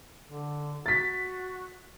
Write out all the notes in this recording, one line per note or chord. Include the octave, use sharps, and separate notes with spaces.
D3
F#4 A6 B6